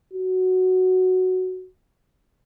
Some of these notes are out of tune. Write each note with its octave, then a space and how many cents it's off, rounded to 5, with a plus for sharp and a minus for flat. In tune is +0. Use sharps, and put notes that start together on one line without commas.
F#4 +0